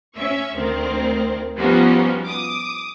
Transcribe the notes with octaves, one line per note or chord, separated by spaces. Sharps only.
C#4 E5 C#6
D2 D#3 C4
F3 G3 B3 C#4 D#4 F#4
D6 D#6